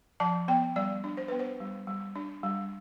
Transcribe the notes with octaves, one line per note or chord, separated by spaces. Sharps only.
F3 A5
B3 G5
G3 D5
D4
C5
B3 B4
C5
G3
G3
D4
G3